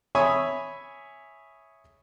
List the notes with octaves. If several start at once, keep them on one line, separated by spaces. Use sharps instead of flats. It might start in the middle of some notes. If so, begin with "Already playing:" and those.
C#5 E5 G#5 B5 C#6 D#6